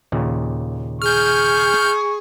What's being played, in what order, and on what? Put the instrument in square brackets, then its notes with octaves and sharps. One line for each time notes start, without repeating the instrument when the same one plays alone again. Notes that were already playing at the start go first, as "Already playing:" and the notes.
[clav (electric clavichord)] D#2 A#2 C#3
[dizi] G#4 [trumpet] C#6 [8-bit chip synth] F6 G6